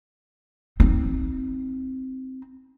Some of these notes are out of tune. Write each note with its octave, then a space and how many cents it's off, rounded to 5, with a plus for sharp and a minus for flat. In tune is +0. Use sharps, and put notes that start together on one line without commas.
C4 +0 D#4 +30